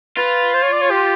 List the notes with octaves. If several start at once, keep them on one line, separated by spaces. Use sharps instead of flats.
F4 B4
C5
C#5
D5
C#5
G4